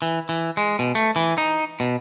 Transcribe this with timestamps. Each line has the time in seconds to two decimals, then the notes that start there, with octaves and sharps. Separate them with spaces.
0.02 E3
0.29 E3
0.57 G#3
0.79 B2
0.95 A3
1.16 E3
1.38 D#4
1.80 B2